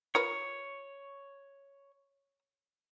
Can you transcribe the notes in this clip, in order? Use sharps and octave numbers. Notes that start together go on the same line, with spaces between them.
F4 A#4 B4 C#5